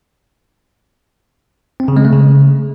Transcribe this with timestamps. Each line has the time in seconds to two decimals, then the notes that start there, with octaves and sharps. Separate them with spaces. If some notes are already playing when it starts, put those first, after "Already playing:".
1.80 C4
1.88 C#3
1.96 G#3
2.05 A3
2.13 C#3